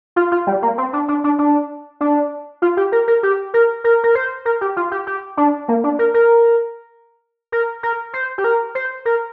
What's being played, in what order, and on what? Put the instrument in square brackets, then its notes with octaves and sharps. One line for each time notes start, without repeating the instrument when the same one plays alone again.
[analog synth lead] F4
F4
G3
A#3
C4
D4
D4
D4
D4
D4
F4
G4
A#4
A#4
G4
A#4
A#4
A#4
C5
A#4
G4
F4
G4
G4
D4
A#3
D4
A#4
A#4
A#4
A#4
C5
G4
A#4
C5
A#4